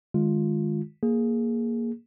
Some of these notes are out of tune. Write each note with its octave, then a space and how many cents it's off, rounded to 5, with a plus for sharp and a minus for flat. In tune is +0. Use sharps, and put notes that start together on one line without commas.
D#3 -25 G#3 +0 F4 +0
A#3 +0 G#4 +0